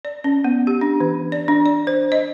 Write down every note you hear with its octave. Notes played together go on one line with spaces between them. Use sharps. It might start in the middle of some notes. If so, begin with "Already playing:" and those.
D5
C#4
B3
G4
D4
E3
D5
D4
D5
C5
D#5